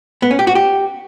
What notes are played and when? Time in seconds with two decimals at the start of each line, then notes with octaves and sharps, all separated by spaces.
0.22 B3
0.31 C#4
0.39 G4
0.47 F#4
0.55 G4